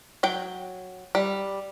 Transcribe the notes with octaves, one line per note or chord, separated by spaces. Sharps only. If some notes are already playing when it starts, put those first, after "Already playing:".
F#3 G5
G3